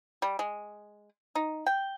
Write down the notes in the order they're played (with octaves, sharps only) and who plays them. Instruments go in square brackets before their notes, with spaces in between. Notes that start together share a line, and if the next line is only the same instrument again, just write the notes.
[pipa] G3
G#3
D#4
G5